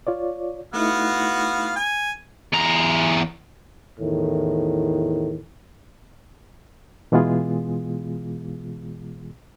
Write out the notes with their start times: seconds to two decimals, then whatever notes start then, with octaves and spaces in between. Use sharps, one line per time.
0.07 F4 C#5 D5
0.74 A3 B3 D#4 E4 F#4 F5
1.76 G#5
2.53 E2 A#5
4.00 E2 A2 D#3
7.12 B2 E3 G#3 B3 F4 G#4